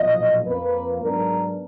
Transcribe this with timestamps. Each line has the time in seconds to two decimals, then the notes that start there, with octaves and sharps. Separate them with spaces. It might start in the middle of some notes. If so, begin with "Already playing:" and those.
Already playing: B1 A#2 F3 D#5
0.47 F2 F3 A#3 B4
1.03 G#2 F#3 B3 D4 A#4